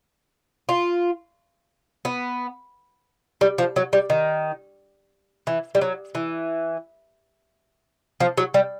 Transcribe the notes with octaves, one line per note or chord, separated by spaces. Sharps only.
F4
B3
G3
F3
F#3
G3
D#3
E3
G3
F#3
E3
F3
F#3
G3